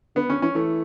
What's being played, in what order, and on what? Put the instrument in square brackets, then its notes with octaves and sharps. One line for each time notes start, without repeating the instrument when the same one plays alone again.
[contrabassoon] D3 [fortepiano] B3
[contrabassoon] D3 [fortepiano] C#4
[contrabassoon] E3 [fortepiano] C#4
[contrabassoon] E3 [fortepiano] A3